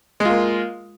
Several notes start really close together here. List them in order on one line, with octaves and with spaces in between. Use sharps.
G#3 F4 A#3